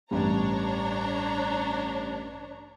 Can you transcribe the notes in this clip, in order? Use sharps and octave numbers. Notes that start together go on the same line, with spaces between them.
A1 G2 D4 C#5 A#5